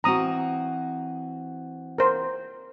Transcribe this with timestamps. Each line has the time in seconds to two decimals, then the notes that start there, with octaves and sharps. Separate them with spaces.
0.04 E3 C4 F#4 A#5 D#6
1.98 A#4 C5